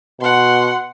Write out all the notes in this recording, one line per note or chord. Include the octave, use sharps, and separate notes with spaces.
B2 F#5 C6